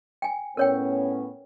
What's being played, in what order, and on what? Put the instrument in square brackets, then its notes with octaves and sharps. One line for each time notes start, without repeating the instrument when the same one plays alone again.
[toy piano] G5 G#5
[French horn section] A2 B3 C#4 [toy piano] A#4 C#5 G5